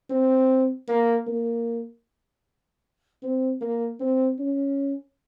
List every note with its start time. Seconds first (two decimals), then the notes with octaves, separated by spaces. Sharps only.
0.10 C4
0.88 A#3
1.27 A#3
3.22 C4
3.61 A#3
4.00 C4
4.39 C#4